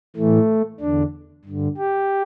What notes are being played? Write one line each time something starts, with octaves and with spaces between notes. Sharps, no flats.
A2 E3 A3
E2 D3 D4
G2 D3
G4